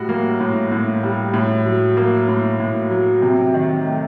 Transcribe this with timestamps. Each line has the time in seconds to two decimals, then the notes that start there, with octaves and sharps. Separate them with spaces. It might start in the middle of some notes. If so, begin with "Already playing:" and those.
Already playing: A2 G3 F#4
0.09 A#3
0.41 A2
0.72 A2
1.03 G3
1.34 A2
1.66 F#3
1.97 A#3
2.28 A2
2.60 A2
2.91 F#3
3.22 C3
3.54 D#3
3.85 A3